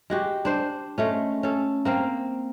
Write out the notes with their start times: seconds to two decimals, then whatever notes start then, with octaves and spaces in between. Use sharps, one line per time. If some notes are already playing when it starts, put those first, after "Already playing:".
0.10 G#3 F#4 G4
0.45 D4 C5
0.98 G#3 A3 C#4
1.43 C#4 A4
1.85 A#3 C4 F5